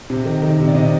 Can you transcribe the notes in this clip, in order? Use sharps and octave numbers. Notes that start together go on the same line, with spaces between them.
C3
D#3
D#3
C3
D5
C3 D#5